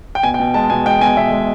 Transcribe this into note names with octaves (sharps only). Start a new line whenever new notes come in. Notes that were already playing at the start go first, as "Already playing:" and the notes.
G5
B2 G#5
G5
B2
G#3 A5
B2 G#5
G#3 G5
B2 G#5
B2 E5
G#3